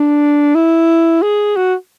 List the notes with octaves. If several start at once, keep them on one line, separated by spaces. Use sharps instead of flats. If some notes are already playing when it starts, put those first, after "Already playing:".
Already playing: D4
E4
G#4
F#4